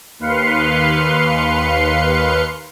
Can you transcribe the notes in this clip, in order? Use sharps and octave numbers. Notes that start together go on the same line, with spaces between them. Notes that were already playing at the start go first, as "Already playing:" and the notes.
D#2 B4 F5 C6 C#7